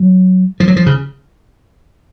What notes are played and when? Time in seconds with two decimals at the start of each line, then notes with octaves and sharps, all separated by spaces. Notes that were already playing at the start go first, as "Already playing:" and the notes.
Already playing: F#3
0.60 F3
0.68 F#3
0.76 F3
0.86 C#3